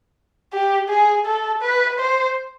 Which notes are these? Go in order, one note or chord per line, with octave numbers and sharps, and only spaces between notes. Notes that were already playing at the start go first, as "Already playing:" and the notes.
G4
G#4
A4
B4
C5